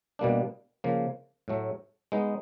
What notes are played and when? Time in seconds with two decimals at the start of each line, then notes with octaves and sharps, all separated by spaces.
0.19 B2 G3 A#3 D4
0.84 C#3 F3 A#3
1.48 A2 F#3 A3
2.12 G#3 B3 D#4